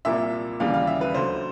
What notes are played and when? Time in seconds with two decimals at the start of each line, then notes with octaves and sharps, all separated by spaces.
0.05 C2 A#2 F3 A#3 E5
0.60 D#2 C#3 E3 G3 F5
0.74 F5
0.87 E5
1.01 B4
1.14 D2 D3 F#3 C5